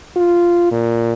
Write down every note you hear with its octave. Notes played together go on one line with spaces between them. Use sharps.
F4
A#2